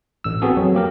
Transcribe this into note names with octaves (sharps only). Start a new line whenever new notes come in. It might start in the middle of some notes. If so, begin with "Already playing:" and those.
A1 E6
B3 C4 F#4 G#4 A4
F2 F#3
A#3 G4 A#4